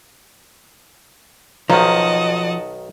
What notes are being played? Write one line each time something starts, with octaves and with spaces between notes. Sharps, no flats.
B1 D#3 F3 D#5 F#5 A5 A#5